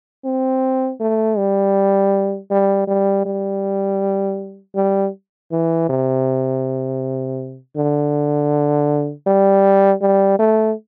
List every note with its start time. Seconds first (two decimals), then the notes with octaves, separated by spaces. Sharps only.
0.24 C4
1.00 A3
1.37 G3
2.51 G3
2.88 G3
3.26 G3
4.75 G3
5.52 E3
5.89 C3
7.76 D3
9.27 G3
10.01 G3
10.39 A3